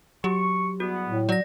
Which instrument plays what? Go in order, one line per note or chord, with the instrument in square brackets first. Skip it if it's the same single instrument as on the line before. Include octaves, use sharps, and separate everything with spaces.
[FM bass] F#3 [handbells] G4 [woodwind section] C#6
[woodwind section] E2 G3 B3 [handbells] F#4
[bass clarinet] A2
[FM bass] F#3 [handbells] D5 A#6